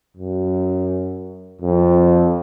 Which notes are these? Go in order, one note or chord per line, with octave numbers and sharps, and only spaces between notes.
F#2
F2